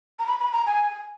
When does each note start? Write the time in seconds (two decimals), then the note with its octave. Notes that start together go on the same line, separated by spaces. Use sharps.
0.19 A#5
0.27 B5
0.40 B5
0.53 A#5
0.66 G#5